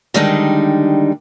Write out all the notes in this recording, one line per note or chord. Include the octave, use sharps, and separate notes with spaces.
D3 D#3 G3 G#3 D4 D#4